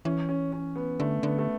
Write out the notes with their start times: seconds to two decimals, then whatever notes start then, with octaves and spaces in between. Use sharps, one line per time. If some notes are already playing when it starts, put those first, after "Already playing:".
0.05 E3 C#4
0.29 C#4
0.52 C#4
0.76 B3
1.00 D3 A3
1.23 D3 B3
1.38 A3